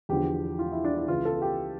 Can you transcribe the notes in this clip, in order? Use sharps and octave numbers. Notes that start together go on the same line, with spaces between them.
E2 D3 F3 G4
F4
E4
D4
E4
C#2 C#3 E3 F4
A4
G4